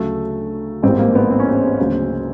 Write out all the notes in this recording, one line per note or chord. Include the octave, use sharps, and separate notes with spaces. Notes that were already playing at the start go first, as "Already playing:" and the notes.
Already playing: D2 C#3 F#3 A3
A1 G#2 E3 G3 A#3 C4
A#3
B3
C4
C#4
C4
D2 C#3 F#3 A#3